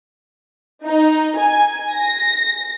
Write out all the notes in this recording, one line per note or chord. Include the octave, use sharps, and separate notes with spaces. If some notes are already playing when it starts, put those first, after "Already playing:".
D#4
G#5
A#6